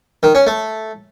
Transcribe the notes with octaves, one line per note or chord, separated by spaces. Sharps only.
D#3
C#4
A3